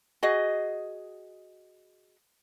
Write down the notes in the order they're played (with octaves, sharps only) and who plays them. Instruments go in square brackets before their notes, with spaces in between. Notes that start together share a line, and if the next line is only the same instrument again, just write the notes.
[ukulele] F#4 G#4 D#5